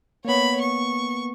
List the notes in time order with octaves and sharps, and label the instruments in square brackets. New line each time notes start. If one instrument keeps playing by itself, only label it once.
[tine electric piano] A#3 B3 [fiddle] C#5 B5
[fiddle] C#6